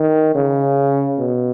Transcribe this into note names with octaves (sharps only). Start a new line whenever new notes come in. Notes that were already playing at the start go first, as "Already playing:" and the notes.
Already playing: D#3
C#3
B2